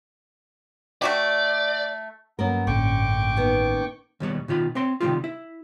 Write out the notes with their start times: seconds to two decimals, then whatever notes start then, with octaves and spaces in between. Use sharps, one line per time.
1.02 A3 F#4 G4 D5
2.39 G2 F#3 A#3 B3 C#4 A#4
2.67 A1 D3 G5 C#6 D6
3.37 D#3 B3
4.20 D#2 B2 G3 C#5
4.48 B2 D#3 F4 B5
4.75 C4 C#5 C6
5.00 C3 D#3 G3 G#3 D#4 F4
5.24 E4